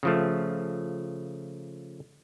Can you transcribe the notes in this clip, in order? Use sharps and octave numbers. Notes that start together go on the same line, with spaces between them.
C#3 F3 A3